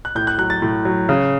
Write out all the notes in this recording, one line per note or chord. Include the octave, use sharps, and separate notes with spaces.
F#6
A2 G6
F#6
F#3 F#6
A6
A2
F#3
C#3